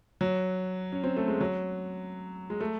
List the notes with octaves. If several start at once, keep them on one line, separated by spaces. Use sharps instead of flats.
F#3
C#4
C4
A3
G#3
F#3
G#3
A3